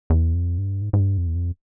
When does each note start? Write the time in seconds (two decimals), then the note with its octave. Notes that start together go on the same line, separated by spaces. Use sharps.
0.10 E2
0.34 F2
0.58 G2
0.82 G#2
0.93 G#2
1.00 G2
1.18 F2
1.27 E2
1.35 F2